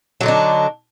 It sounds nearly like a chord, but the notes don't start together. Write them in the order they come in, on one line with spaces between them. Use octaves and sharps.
F#3 D3 D#4 D4